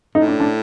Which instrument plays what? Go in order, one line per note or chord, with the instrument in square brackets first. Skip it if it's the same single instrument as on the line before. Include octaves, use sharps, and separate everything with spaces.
[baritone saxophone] A2 [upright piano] D#4
[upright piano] D4
D4